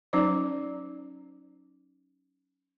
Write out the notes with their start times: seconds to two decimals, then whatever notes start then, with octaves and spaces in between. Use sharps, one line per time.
0.13 F#3 C#4 D#4 C5 D5 D6